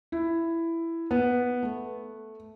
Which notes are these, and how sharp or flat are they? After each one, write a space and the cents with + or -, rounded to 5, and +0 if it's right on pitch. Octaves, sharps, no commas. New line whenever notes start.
E4 +10
B3 -5
A3 -5